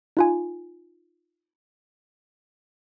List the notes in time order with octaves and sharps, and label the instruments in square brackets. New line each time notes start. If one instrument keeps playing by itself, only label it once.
[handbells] D#4 F4 G#5